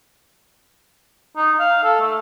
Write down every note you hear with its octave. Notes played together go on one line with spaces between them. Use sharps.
D#4
F5
A4
A3